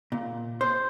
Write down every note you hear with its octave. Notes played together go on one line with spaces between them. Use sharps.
A#2
C5